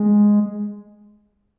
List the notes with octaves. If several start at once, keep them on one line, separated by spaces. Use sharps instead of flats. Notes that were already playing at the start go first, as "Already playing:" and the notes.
Already playing: G#3